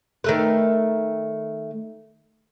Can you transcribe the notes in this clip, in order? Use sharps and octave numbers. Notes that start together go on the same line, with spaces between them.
D#3 A3 B4